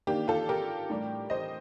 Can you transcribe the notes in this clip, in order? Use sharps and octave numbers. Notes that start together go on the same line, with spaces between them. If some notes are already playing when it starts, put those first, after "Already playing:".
D#3 A#3 D4 G4
F4 A4
G4 A#4
A2 G3 D4
C5 D#5